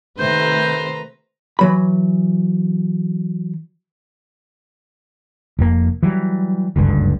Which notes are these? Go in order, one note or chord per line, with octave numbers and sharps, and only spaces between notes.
C3 D#3 A3 B4 C5 A#5 G6
E3 F#3 B5
F1 F2 A#3
E3 F#3 G3
F#1 C#2 G2 D3